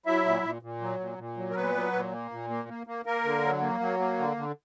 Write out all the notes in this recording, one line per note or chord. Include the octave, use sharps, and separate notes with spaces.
F#3 E4 E5
A#2
A#2
A#2
F#3
A#2
A#2
F#3
A#4
A#2 B3 B4
F#3
A#2
A#3
A#2
A#3
A#3
A#3
A#3 A#4
D3
F#3
A#3
F#3
A#3
D3
D3